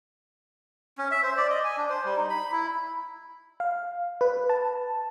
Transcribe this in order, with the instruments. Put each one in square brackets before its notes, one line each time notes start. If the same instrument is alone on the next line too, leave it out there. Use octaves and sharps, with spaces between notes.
[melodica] C#4
E5
C5
D5
D#5
G#5
D4
C5
G3
D#4
B5
E4
[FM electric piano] F5
B4
A5